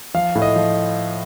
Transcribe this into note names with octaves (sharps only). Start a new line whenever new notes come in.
F3 F5
A2
D#5
F3